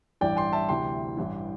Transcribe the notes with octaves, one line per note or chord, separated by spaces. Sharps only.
A1 G2 E3 D5 G5
G5 C6
E5 A5
D2 C3 E3 G5 C6
A1 G2 E3